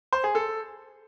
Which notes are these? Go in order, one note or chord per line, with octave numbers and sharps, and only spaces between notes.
C5
G#4
A4